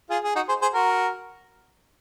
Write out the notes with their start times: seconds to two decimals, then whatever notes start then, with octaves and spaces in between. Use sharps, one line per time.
0.10 F4 G#4
0.24 G#4
0.36 D#4 F#4
0.49 G#4 C5
0.62 G#4 C5
0.74 F#4 A#4